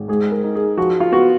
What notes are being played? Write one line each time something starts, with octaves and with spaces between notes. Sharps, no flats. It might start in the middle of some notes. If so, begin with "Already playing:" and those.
Already playing: G#1
G#2 G#4
A#4
D#4
G#4
F3 F#4
F4
B3 F#4